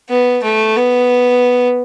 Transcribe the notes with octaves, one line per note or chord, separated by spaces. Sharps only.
B3
A3
B3